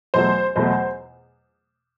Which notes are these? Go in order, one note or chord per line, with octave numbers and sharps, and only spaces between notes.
E2 B2 F#3 A3 C5
E2 B2 F#3 A3 C5